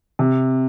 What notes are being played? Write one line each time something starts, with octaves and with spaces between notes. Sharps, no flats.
C3